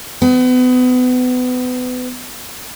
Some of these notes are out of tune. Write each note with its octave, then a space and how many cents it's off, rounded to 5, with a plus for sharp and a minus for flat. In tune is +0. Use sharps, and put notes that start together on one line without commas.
B3 +30